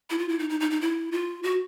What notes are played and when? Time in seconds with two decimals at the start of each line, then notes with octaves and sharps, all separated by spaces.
0.10 E4
0.19 F4
0.29 E4
0.39 D#4
0.50 D#4
0.60 D#4
0.71 D#4
0.81 E4
1.12 F4
1.43 F#4